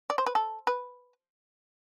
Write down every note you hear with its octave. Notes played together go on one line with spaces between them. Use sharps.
D5
C5
B4
A4
B4